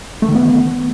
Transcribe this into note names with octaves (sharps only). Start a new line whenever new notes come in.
A3
D#3
B3